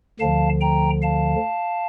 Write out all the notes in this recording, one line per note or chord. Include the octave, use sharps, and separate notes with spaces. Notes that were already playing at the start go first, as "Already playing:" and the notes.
D2 D3 F3 F5 A5
G5 A#5
F5 A5